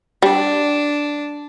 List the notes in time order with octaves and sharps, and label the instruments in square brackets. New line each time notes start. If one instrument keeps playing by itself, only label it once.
[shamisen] G3 [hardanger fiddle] D4